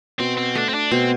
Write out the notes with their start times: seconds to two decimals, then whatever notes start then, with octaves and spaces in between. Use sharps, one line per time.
0.20 B2 C4
0.38 C4
0.55 A3 D4
0.69 C4
0.74 D4
0.91 B2 C4